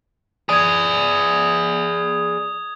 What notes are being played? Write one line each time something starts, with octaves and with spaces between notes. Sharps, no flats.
G#4 D5 D#6 G#6